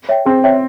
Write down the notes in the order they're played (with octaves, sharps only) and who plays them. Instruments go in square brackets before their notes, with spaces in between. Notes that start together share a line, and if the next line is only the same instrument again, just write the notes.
[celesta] C#5 E5 G5
[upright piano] C4 [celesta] G#4
[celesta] C#5 E5 G5